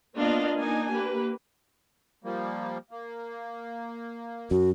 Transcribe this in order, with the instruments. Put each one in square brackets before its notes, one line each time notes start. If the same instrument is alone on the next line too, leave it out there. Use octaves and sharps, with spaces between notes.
[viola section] A#3 B3 D4 F4 D#5 F5
A#3 D4 D#4 G#5
A#3 G4 B4
[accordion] F3 G3 A#3
A#3
[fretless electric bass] F#2 [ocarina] F#4